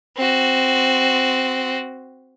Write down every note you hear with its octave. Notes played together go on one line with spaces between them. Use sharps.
C4 F#4